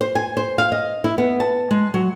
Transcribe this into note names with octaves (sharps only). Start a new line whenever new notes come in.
C5
G#5
C5
F5
D#5
E4
B3
A5
G#3
F#3